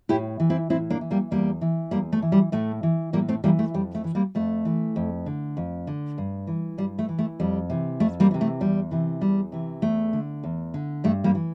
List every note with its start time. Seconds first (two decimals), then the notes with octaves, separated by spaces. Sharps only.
0.09 A2 E4 G4
0.40 E3
0.50 C4 E4
0.70 A2 C4 E4
0.90 A#3 D4
1.01 E3
1.11 G3 A#3
1.31 E2 G3 A#3
1.61 E3
1.91 E2 G3 A#3
2.13 A3
2.22 E3
2.32 G3
2.52 A2 A3
2.83 E3
3.13 A2 G3 A#3
3.29 A3 C4
3.44 E3 G3 A#3
3.59 A3
3.74 F2 G3
3.95 A3
4.04 E3
4.15 G3 A#3
4.35 F2 A3
4.65 E3
4.96 F2
5.26 D3
5.57 F2
5.87 D3
6.18 G2
6.47 E3
6.78 G2 G3
6.99 A3
7.09 E3
7.19 A3
7.40 F2 G3
7.70 C3 E3
8.00 F2 A3
8.20 G3 A#3
8.31 C3 E3
8.41 A3
8.60 E2 G3
8.91 C3 E3
9.21 E2 G3
9.52 C3 E3
9.82 E2 A3
10.13 D3
10.44 E2
10.74 D3
11.04 G2 A3
11.24 G3 A#3
11.35 E3